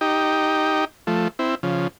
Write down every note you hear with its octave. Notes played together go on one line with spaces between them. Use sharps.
D#4 G4
F3 A3
C4 E4
C#3 F3